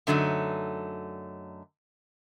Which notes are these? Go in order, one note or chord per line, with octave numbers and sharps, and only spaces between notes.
F#2 D3 F#3 A3 D#4